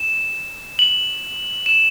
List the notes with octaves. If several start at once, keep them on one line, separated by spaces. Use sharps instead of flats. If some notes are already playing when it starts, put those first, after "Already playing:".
Already playing: E7
F#7
E7